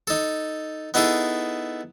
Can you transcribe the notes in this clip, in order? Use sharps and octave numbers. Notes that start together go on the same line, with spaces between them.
D#4 A4
B3 D#4 E4 G#4 A4